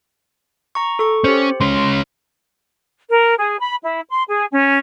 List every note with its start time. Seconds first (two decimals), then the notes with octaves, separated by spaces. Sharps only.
0.75 A#5 C#6
0.99 A4 C#6
1.24 C#4 G4 C5
1.61 G#3 C#4 C6
3.09 A#4
3.38 G#4
3.59 B5
3.83 E4
4.10 C6
4.28 G#4
4.52 C#4